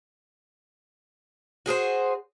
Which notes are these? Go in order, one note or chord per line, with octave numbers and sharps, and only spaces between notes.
F#4 G#4 A#4 C5